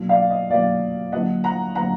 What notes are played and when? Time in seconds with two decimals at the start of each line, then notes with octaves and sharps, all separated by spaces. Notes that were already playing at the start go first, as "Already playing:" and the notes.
Already playing: B2 F#3 A#3 D4
0.09 D5 F5
0.30 D#5
0.50 B2 F#3 A#3 D4 D5 F5
1.12 D3 F#3 A#3 D4 D#5 F#5
1.44 F#5 A#5
1.75 D3 F#3 A#3 D4 F#5 A#5